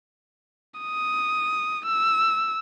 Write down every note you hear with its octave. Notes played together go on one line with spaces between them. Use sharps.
D#6
E6